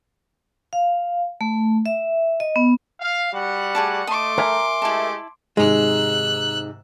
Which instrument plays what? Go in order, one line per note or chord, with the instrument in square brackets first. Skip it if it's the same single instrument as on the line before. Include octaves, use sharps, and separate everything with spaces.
[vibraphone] F5
A3
E5
D#5
B3
[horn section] F5
G3 F#4 F#5
[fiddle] A3 [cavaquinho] G#4 D5 A5
[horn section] A3 [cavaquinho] D#5 A5 [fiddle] C6 D6
[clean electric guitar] A#4 E5 G#5 [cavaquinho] A#5
[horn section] G#3 A3 G4 [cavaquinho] E4 A5
[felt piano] G#2 C3 D#3 [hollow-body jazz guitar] G#3 [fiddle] E6 F#6